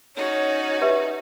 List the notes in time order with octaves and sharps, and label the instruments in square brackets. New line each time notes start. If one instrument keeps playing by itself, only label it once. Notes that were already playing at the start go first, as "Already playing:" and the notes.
[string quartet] C#4 D#4 F#4 [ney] C#5
[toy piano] G4 B4 E5